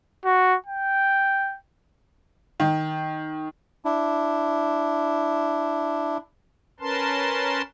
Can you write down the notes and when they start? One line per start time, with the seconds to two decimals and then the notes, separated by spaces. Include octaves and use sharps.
0.25 F#4
0.67 G5
2.60 D#3
3.85 D4 E4
6.80 C#4 A#4 B4 A5 C6